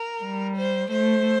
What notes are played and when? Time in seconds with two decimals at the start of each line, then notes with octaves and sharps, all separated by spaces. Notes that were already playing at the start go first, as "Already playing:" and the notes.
Already playing: A#4
0.23 G3
0.57 C5
0.91 A3 C5